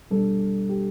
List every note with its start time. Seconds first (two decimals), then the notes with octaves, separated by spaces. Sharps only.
0.11 B2 G3 D4 A4
0.69 G4